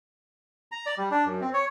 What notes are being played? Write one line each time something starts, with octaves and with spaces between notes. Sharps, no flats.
A#5
D5
G3
D4
F#2
C4
C#5